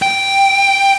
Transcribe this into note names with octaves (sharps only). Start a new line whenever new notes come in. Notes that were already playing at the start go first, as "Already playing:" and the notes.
G5